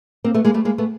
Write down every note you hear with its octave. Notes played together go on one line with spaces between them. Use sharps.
A#3 C4
A3 B3
G#3 A#3
G3 A3
G#3 A#3
A3 B3